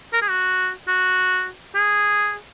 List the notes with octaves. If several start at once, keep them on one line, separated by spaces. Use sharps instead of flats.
A#4
G#4
F#4
F#4
G#4